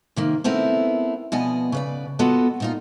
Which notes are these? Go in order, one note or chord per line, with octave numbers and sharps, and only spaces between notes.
C3 D#3 A#3
A3 B3 C4 E4 A#4
B2 F3 B3 D5 D#5 G#5
C#3 B4 D5
B3 F4 F#4 A4 D#5
A#2 D#4 F4